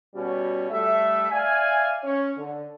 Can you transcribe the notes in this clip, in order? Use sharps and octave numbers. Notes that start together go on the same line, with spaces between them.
B2 G3 C#4 F#4
G3 A3 E5
D5 E5 F5 G#5
C#4 C#5
D3